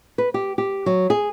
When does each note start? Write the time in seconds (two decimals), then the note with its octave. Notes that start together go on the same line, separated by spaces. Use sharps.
0.18 B4
0.34 G4
0.58 G4
0.86 F#3
1.10 G#4